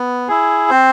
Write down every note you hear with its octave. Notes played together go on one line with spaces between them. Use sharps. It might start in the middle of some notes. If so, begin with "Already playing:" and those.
Already playing: B3
E4 G#4
C4 C5